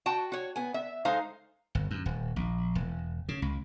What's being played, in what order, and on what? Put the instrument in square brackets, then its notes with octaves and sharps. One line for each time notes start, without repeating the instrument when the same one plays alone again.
[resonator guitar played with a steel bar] F#4 G5 A5
F#4 C#5
B3 G#5
E5
G#3 D#4 A4 C5 F5
[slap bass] G1
F#2
D#1
A#1
E1
C#3
C#2